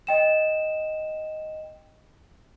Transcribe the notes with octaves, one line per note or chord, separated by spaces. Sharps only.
D#5 G5 E7